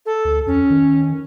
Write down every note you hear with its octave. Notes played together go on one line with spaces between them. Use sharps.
A4
D2
F2 C#4
D#3